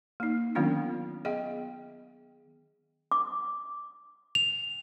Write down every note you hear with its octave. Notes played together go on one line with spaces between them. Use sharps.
A#3 D#4
D#3 F#3 B3 C#4 D4 F4
B3 G#4 D#5 E5 G5
D6
F7